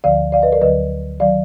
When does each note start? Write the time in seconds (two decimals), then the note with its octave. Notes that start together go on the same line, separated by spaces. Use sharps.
0.04 D2 D3 F3 D5 F5
0.32 D5 F5
0.42 B4 D#5
0.52 A#4 D5
0.61 D2 D3 F#3 B4 D#5
1.20 D#3 F#3 D5 F5